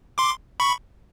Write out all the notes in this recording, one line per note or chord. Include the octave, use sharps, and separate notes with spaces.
C6 D6
B5 C#6